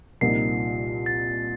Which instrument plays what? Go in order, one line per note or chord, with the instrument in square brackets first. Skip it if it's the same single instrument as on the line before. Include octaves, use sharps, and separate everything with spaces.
[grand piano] C2 A#2 F3 A#3 D#4 [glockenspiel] C7
[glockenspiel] A6